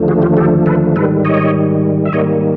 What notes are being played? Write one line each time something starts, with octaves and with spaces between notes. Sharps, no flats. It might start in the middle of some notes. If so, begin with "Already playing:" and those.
Already playing: D#2 D3 F3 A3
F#4 G#4
F4 G4
G4 A4
A4 B4
G#2 D#3 G3 A4 B4
C#5 D#5
E5
G#2 D#3 G3 A#3 C#5 D#5